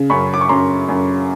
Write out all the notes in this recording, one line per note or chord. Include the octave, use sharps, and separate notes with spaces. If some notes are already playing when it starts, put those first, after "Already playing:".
Already playing: C#3
F#2 B5 C#6
D6
C#6
F#2 A#5 C6
F#2